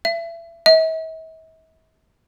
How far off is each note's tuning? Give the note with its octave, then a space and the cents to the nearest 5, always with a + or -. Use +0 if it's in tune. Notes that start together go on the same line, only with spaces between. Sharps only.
E5 +30
E5 -45